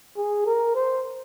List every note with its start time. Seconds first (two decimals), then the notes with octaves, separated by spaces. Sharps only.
0.17 G#4
0.46 A#4
0.75 C5